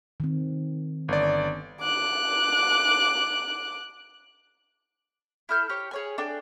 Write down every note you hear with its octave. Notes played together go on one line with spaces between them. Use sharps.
D#3 C4
G1 D5
D6 F#6
E4 A4 F6 G6
G4 C#5
G#4 C#5 G#5
D4 A4 G5 G#5